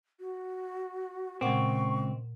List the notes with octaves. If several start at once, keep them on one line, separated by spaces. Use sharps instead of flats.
F#4
C#2 A#2 C4 F#5 C#6